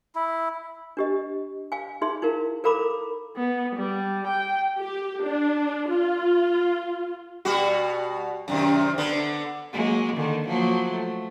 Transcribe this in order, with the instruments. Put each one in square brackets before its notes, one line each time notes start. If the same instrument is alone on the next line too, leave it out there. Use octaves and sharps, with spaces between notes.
[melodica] E4
[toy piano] D4 G4 D#5
F5 G#5
D#4 G#4 E5 C6
D#4 E4 A#4 F5
A4 A#4 F5 A#5 B5 D6
[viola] B3
G3
G5
[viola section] G4
D4
F4
[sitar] B2 G3 F#4
F#2 C3 D#3
D3 B3
[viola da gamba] F#3 G#3 A#3
D3 D#3
F3 F#3 A#3
A3